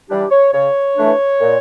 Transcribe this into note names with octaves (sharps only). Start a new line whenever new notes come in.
E3 G3 D4 G4
C#5
C#3 C#5
E3 A3 D4
A#2